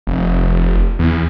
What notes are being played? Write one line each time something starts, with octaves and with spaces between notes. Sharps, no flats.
F1
E2